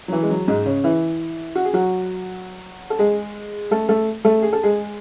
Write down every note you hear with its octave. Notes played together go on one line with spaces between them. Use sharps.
F#3
E3
G#3
F#3
G#2 G#3
C#3 C#4
E3 E4
F#4
G#4
F#3 F#4
A4
G#3 G#4
A3 A4
A3 A4
A3 A4
G#4
A4
G#3 G#4